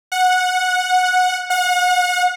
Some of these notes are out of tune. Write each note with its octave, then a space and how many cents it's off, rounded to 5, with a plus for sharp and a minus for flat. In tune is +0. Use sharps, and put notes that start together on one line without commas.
F#5 -15
F#5 -35